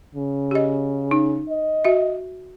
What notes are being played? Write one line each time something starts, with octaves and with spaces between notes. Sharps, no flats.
C#3
G4 D#5
D#4
D#5
F#4 E5